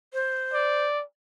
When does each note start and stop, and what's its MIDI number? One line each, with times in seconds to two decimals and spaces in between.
0.13 0.84 72
0.54 1.04 74